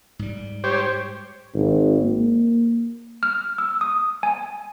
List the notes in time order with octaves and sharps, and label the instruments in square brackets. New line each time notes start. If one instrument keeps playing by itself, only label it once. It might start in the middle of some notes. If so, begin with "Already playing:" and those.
[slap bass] G#2 G3
[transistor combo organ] G4 C5 C#5
[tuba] G#1
A#3
[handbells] F6
E6
D#6
G#5